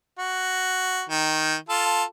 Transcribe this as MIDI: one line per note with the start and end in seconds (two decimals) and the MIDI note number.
0.19 1.02 66
1.10 1.55 51
1.69 2.04 65
1.69 2.04 69